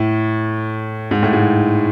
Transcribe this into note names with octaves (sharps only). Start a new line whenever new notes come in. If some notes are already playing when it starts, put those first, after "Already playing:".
Already playing: A2
G#2
A2
G#2